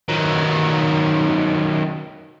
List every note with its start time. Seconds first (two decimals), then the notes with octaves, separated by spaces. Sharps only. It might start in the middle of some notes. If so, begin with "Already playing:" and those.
0.09 D#3 F#3